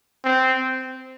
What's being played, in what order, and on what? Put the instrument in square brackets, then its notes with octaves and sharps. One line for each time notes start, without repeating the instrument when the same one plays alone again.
[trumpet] C4